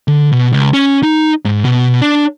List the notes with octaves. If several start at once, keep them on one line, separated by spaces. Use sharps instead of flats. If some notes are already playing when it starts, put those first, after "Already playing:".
D3
B2
C#2
C#4
D#4
G#2
B2
D4